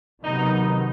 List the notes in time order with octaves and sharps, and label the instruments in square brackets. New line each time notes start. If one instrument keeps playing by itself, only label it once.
[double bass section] C3 D#3 F#3 B3 [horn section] D#4